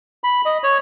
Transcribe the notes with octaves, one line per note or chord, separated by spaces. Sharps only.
B5
D#5
C#5